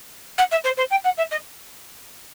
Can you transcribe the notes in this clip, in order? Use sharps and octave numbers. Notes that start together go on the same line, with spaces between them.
F#5
E5
C5
C5
G5
F#5
E5
D#5